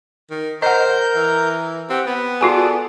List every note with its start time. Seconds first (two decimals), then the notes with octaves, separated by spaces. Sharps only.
0.31 D#3
0.62 A#4 C5 D#5 F#5 A#5 G6
1.16 E3
1.90 C4 G4 F#5
2.07 B3 B5
2.41 F4 F#4 G#4 A4 D5 G#5